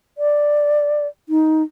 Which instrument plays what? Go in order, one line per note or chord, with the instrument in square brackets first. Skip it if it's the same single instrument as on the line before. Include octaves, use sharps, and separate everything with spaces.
[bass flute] D5
D#4